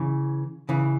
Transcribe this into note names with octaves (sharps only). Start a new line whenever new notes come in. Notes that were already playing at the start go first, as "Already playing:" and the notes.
Already playing: C#3 E3
C#3 E3